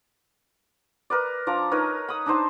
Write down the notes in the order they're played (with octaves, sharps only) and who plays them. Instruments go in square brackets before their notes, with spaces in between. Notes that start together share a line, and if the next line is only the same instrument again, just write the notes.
[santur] A#4 B4 D5
F3 D4 A#5 D6
D#4 A#4 B4 C#5
B5 D#6
D4 D#4 C5 A5